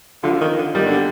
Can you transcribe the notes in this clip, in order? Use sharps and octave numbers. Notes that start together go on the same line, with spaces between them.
D3 F3
D#3
D3
D#3 G3
D3